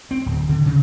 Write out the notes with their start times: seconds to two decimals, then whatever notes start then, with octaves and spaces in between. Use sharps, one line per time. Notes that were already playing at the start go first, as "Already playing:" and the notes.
0.11 C4
0.26 D1
0.49 D3
0.66 C#3